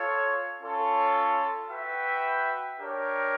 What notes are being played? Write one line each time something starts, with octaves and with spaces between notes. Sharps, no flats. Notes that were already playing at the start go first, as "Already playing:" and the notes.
Already playing: F4 A4 C#5
C#4 F4 A4 C#5
F#4 B4 E5 G5
D4 G4 A#4 C#5